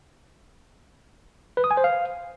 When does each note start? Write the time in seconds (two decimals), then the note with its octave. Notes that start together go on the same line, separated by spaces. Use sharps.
1.57 B4
1.64 D#6
1.71 G#5
1.77 C5
1.84 F5